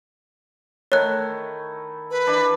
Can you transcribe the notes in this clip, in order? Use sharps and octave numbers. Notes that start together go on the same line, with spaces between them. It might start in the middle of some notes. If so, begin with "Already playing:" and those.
D#3 A3 E4 C#5 F#6
B4
E3 D4 B5